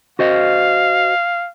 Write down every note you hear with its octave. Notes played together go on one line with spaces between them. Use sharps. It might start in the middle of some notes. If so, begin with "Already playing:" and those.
F#4 C5 D#5 F5